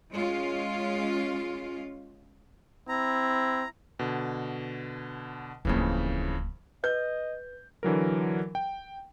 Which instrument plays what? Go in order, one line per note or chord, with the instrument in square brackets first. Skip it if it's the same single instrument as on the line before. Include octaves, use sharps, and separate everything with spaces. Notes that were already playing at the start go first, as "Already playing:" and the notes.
[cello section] G#3 C#4 F4
[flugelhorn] C4 [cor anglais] E4 [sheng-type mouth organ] A#5
[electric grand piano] B2 D3
[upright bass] D1 A#3 [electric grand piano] F2 C#3 E3
[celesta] B4 [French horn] D#5 [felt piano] G6
[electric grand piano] D3 E3 F#3 A#4
G5